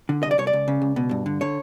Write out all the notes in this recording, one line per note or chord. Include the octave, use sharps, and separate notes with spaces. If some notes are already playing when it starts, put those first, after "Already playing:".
D3
C2 D#5
D5
C2 C#5
D5
C#2
C#3
C#2
B2
G2
D3
D3 C#5